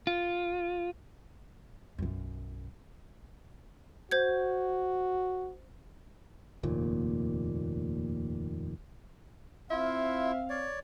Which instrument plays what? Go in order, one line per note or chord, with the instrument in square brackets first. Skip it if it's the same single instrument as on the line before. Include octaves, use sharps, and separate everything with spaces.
[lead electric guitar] F4
[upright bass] B1 F#2
[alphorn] F#4 [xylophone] C5 G6 G#6
[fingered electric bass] F1 D#2 A#2
[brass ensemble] C4 F5 [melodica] E4 F4 [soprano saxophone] E5
[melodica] C#5 D5